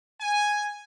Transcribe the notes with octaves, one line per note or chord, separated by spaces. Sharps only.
G#5